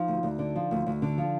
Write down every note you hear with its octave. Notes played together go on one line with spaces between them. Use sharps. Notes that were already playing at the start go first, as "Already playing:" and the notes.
Already playing: F3 D#4
D2
D2
D3
F3
D2
D2
D3
F3